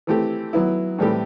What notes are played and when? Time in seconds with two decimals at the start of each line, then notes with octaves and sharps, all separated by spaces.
0.07 E3 A3 C4 G4
0.53 F#3 B3 E4
0.98 A2 E3 G3 C4 G4